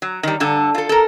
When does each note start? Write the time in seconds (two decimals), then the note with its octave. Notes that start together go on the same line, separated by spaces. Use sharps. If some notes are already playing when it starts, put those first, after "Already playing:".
0.02 F#3
0.23 D#3 G3
0.40 G2 D3 A4
0.75 F4 A4
0.89 A4 A#4